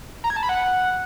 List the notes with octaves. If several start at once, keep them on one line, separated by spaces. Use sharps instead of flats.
A#5
G#6
A5
B5
F#5